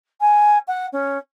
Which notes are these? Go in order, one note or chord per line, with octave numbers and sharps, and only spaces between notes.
G#5
F#5
C#4